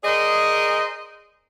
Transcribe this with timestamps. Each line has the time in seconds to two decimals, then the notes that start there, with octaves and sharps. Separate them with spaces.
0.04 G#4 A#4 C5 D5 D#5